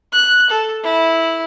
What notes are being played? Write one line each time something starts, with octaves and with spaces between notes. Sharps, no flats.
F#6
A4
E4